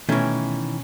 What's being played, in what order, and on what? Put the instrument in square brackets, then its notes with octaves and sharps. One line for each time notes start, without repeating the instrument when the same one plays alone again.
[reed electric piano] B2 [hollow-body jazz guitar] D#3 E3 [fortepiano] A3 [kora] C#4